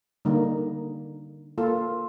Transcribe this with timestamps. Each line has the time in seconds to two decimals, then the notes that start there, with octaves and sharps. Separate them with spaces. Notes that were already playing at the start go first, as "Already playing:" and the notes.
0.25 D3 G3 A#3 D#4
1.58 A#3 F4 A4